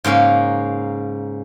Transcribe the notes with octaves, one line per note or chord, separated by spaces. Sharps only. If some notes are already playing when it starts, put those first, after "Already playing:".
G#2 C#3 A#3 C#4